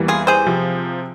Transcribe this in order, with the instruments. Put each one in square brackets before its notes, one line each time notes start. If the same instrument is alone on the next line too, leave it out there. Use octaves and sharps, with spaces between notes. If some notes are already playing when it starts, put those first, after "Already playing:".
Already playing: [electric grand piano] E2 E3 G3 A#3
[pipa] F4 G#4
G#4 C5
[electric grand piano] C3 F3 C4